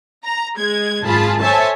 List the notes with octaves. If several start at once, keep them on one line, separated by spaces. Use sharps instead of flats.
A#5
G#3 G#6
G#1 F#2 F4 G#4 A5 B5
A4 C5 C#5 E5 G#5 A5